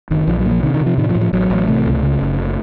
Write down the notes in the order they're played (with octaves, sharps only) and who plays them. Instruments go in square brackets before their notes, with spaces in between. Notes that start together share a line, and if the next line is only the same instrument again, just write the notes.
[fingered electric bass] F#1 D#3
A#1 F3
F#3
A#2
F3
C3 D#3
D#3
C3
F3
A2 D#3
F3
A2
F3
A1 F#3
A1
C3 A3
C#2
C#3
F#1